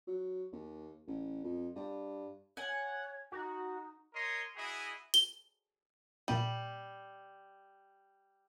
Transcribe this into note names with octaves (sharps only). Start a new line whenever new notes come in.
F#3
D#2
A1
F2
G2
C#5 F#5 G#5
D#4 F#4
A#4 C#5 D#5 C6
E4 F#4 G#4 D#5
G7
A#2 G3 A#3 D#7